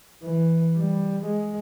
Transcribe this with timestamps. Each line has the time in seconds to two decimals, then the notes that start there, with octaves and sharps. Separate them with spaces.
0.23 E3
0.77 G3
1.26 G#3